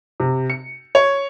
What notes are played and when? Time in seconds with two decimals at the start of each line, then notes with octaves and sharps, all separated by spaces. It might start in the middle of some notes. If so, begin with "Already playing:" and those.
0.20 C3
0.50 C#7
0.95 C#5